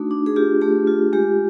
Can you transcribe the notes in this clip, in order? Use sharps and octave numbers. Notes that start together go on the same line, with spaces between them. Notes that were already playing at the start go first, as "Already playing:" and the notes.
Already playing: A3 D4 D#4 F#4
D4
G#4
F4 G4
A3 G4
F4
G#3 G4